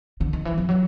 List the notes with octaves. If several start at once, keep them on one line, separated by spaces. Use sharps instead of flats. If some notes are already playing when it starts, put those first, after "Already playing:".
D3
D#3
E3
F3
F#3